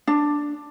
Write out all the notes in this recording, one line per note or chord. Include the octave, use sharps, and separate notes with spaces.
D4